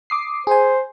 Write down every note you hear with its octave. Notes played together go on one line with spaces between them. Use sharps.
D6 D#6 C7
G#4 C5 G#5